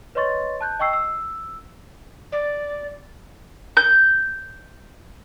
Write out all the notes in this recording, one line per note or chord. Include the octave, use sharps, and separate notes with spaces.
B4 C#5 D#5 C6 C#6 A6
A5 F#6 G6
D#5 G5 C#6 E6 C7
E6
D5
G6